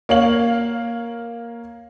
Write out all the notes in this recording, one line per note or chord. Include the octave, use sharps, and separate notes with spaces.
A#3 C#5 F5 F#7